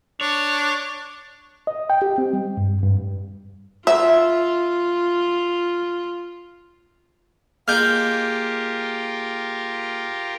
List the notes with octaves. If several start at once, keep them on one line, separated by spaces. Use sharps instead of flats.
D4 C#5
D#5
G5
G4
C4
G3
G2
G2
F4 E5
G#3 A#3 F4 G4 A#4 F6 G6